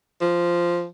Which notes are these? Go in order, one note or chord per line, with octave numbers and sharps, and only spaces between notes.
F3